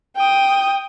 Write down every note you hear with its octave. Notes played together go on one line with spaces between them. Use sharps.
G5 D#6